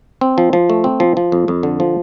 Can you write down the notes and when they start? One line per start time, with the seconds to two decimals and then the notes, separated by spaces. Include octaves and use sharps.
0.21 C4
0.38 F3
0.53 F3
0.70 A3
0.84 C4
1.00 F3
1.17 F3
1.32 F2
1.48 F2
1.63 D3
1.80 F3